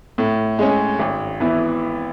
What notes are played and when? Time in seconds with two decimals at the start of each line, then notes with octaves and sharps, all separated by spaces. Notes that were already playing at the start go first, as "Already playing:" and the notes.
0.18 A2
0.59 G#3 C#4
0.99 G#1
1.40 E3 B3 E4